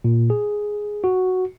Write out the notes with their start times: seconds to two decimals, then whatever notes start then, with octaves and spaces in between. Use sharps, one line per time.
0.04 A#2
0.30 G#4
1.04 F#4